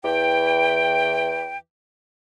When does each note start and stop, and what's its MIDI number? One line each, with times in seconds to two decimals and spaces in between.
0.04 1.58 40
0.04 1.58 52
0.04 1.58 79